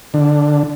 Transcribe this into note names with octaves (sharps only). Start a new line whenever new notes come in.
D3